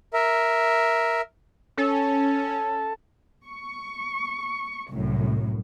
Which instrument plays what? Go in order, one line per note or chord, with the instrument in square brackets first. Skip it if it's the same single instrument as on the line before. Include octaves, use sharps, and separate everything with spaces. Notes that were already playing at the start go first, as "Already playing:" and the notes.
[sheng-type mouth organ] A#4 E5
[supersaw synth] C#4 [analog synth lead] A4
[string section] C#6
C2 F#2 A2